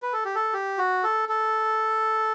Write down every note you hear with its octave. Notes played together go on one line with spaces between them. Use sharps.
B4
A4
G4
A4
G4
F#4
A4
A4